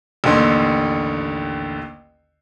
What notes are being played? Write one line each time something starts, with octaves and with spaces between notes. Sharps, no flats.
A1 D#2 D3 C6